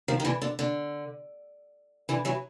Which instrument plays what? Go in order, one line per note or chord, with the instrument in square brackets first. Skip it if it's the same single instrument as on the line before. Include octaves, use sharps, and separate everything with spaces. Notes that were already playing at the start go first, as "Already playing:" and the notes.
[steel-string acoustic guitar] D#3 F3
D#3
D3 E3
D3
D3
D3 E3
E3 F#3